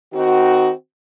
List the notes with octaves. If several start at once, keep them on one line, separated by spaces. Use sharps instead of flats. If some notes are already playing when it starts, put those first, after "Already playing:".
D#3 C4 D#4 F#4